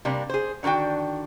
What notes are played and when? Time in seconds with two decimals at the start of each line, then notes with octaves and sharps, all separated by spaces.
0.05 C3 G3 A#3 D4
0.30 G#4 C5
0.63 D3 D#3 D4 F#4 G5